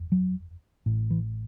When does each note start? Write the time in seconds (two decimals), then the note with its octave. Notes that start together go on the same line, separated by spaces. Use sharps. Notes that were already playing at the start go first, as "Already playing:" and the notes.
Already playing: F#1 E2
0.12 F#3
0.86 A1 A2
1.10 E3